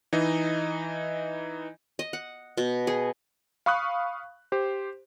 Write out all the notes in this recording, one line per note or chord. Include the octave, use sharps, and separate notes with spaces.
E3 D#4 D#5
D#5
F#5
B2
G#4
F5 B5 C#6 D#6 F#6
G4 C5